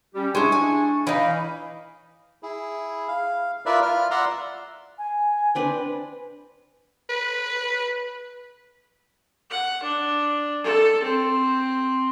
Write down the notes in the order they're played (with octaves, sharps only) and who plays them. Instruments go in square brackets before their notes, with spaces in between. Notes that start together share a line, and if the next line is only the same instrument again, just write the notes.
[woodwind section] G3 C#4 G4
[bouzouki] G#3 E4 [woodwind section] D4 C#6
[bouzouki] G#5
[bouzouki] E3 D#4 [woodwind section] D#5 F5 B5
[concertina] E4 G#4
F5
E4 F4 A#4 B4 D5 E5
F4 F6
D5 E5 F#5 A#5 C6
[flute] G#5
[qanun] C4 D4 B4
[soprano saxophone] B4
[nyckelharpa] F#5
D4
A4
C4